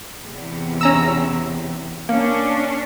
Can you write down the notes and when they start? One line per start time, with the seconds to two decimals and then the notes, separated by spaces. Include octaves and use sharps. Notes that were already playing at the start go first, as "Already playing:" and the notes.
0.21 E2 C3
0.81 C#4 A#5 E6
2.09 A#3 C#4 D4